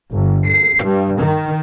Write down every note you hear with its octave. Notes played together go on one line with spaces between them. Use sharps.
G1
C7
G2
D#3